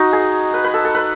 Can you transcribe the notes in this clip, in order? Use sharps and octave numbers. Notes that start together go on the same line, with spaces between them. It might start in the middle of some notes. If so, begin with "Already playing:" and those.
Already playing: D#4 F#4
G#4
B4
B4
A4
A4
B4